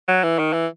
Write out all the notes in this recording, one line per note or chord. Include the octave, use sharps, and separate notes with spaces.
F#3
E3
D#3
E3